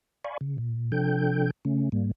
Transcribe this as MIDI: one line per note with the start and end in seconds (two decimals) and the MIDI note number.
0.25 0.38 74
0.25 0.38 77
0.25 0.38 80
0.25 0.38 83
0.25 0.38 85
0.41 0.57 49
0.58 0.91 46
0.92 1.51 48
0.92 1.51 53
0.92 1.51 62
0.92 1.51 69
0.92 1.51 79
0.92 1.51 91
1.65 1.89 49
1.65 1.89 57
1.65 1.89 61
1.92 2.12 44
1.92 2.12 55
1.92 2.12 58